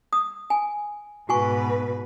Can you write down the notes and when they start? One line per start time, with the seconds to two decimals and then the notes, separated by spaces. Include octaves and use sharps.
0.13 D#6
0.50 G#5
1.29 G#2 B2 F#4 B4 G#5 C#6